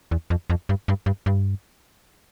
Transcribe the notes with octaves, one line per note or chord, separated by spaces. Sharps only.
E2
F2
F2
G2
G2
G2
G2